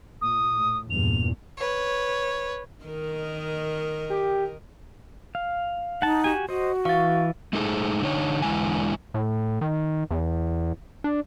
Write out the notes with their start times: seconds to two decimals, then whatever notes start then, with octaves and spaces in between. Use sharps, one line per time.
0.21 A#2 D#6
0.56 A2
0.90 E2 G2 A#2 F7
1.57 B4 C#5
2.84 D#3 A#4 D#5
4.10 G4
5.35 F5
6.02 D#4 F#5 A5
6.24 F#4 G4 G#5
6.49 F#4 C5 D#5
6.85 E3 F5 C#6 A6
7.53 G#3 A3 D#4 G#4 A4
8.03 D3 D#4 C#5
8.42 E2 D3 G#3 E4 G#5
9.14 A2
9.61 D#3
10.11 E2
11.04 D4